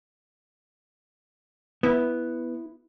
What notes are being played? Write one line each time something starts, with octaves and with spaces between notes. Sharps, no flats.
B3 E4